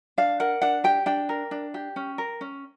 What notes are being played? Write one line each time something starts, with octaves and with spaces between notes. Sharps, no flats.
D4 F5
A#4 F#5
D4 F#5
G4 G5
D4 G5
A#4
D4
G4
C#4
A#4
C#4